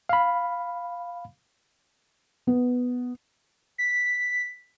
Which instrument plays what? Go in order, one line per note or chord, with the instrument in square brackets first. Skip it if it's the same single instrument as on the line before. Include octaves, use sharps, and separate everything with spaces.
[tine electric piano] F5 B5
[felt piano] B3
[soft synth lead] B6